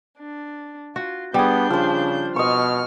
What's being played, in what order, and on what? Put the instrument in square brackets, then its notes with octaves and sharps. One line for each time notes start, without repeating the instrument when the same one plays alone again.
[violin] D4
[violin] F4 [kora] F#4
[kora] G3 G#4 [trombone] B3 [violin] D4 G6
[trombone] C#3 [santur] F3 C5
[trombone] B2 [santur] D#5 C#6 [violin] F6